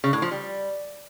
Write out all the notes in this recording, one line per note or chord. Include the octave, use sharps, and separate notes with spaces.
C#3
A2
F3
G3